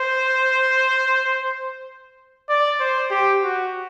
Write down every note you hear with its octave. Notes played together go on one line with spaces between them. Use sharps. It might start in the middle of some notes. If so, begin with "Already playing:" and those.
Already playing: C5
D5
C5
G4
F#4